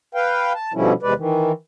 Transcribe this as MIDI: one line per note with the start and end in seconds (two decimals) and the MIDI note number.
0.15 0.53 71
0.15 0.53 77
0.15 0.53 79
0.55 0.72 81
0.74 0.93 47
0.74 0.93 50
0.74 0.93 53
0.74 0.93 55
0.74 0.93 61
0.74 0.93 64
1.03 1.13 40
1.03 1.13 48
1.03 1.13 56
1.03 1.13 71
1.03 1.13 74
1.17 1.52 51
1.17 1.52 52